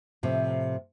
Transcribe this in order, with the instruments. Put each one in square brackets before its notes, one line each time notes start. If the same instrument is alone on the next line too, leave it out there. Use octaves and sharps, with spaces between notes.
[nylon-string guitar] A2 C3 F3